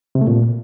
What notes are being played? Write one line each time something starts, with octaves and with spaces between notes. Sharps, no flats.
C3
A3
A#2